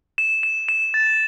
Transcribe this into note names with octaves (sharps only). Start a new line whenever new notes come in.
E7
E7
E7
A6